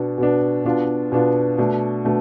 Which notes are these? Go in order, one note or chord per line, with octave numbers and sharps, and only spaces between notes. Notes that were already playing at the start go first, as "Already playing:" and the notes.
Already playing: B2 B3 D4
B2 B3 D4
B2 B3 D4 F4
B2 B3 D4 F4
B2 A3 D4
B2 A3 D4